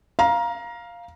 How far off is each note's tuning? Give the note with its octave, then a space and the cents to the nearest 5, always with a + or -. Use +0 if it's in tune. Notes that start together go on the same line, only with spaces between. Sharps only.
F5 +0 A#5 +20